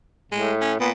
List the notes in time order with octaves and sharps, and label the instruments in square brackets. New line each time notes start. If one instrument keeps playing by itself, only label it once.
[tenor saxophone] A2 [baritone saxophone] G#3
[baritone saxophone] C#4
[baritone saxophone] A#2 [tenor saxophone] B3